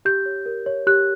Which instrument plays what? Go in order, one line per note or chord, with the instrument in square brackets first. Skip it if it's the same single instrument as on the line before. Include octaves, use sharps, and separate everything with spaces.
[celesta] G4 G6
C#5
A#4
C#5
G4 F#6